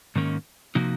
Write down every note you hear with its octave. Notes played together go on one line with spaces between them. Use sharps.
G#2 D#3 A#3 C#4
C3 F3 A#3 D#4 F#4